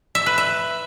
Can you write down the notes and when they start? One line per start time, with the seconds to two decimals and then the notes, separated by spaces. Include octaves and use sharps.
0.15 E5
0.26 B4
0.38 E5